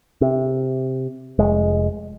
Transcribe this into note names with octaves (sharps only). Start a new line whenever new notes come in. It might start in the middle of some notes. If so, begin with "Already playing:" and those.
C3
F1 G#3